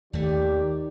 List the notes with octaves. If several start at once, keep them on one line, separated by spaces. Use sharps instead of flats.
D#2 D#3 A3 G4 D5